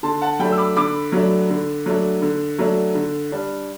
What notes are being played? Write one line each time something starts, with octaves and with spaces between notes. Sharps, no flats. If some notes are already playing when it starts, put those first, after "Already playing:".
D3 A5 C6
F#5 A5
F#3 A3 D4 G5 B5
E6
B5 D6
D3 B5 D6
F#3 A3 D4
D3
F#3 A3 D4
D3
F#3 A3 D4
D3
G3 D4